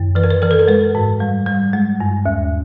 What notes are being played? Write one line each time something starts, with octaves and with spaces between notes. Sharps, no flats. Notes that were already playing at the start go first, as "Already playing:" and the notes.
Already playing: F#2 D#3
E3 B4
A#4
B4
E3 A#4
A4
A#4
G#3 B4
G#2
G3
G3
G#3
G2
D#2